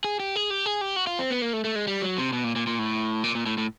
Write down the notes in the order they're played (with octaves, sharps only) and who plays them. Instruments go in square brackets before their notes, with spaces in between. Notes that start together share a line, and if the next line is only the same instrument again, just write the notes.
[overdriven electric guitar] G#4
G4
G#4
G4
G#4
G4
F#4
F4
C4
B3
A#3
A3
A3
G#3
G3
F#3
C3
B2
A#2
A#2
A#2
A2
A#2
A#2
A2
A2